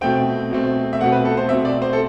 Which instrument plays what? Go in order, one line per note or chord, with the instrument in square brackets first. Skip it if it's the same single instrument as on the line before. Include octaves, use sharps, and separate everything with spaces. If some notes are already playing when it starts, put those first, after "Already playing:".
[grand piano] B2 A3 C4 G5
B2 A3 C4
E5
B2 A3 C4 F#5
B4
A4
C5
B2 A3 C4 E5
D5
C5
A4